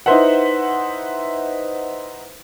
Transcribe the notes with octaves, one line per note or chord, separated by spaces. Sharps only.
D#4 E4 B4 C5 E5 F#5